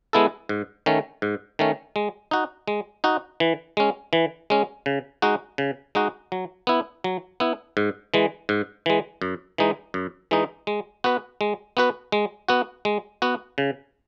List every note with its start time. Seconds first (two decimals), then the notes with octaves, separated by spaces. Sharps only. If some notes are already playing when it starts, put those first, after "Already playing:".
0.13 G#3 B3 E4 A4
0.49 G#2
0.86 D#3 A3 C#4
1.22 G#2
1.59 D#3 A3 C#4
1.96 G#3
2.31 D#4 F#4
2.68 G#3
3.04 D#4 F#4
3.40 E3
3.77 G#3 C#4
4.13 E3
4.50 G#3 C#4
4.86 C#3
5.22 G#3 D#4 F#4
5.58 C#3
5.95 G#3 D#4 F#4
6.32 F#3
6.67 B3 E4
7.04 F#3
7.40 B3 E4
7.77 G#2
8.14 E3 G#3
8.49 G#2
8.86 E3 G#3
9.22 F#2
9.58 E3 G#3 D#4
9.94 F#2
10.31 E3 G#3 D#4
10.67 G#3
11.04 B3 F#4 B4
11.41 G#3
11.77 B3 F#4 B4
12.12 G#3
12.49 B3 F#4
12.85 G#3
13.22 B3 F#4
13.58 C#3